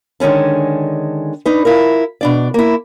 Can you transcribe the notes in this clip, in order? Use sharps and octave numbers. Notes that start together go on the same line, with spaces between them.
D3 D#3 G#3 C#4 D4
D4 D#4 B4
E4 F4 A#4
B2 D4 D5
A#3 E4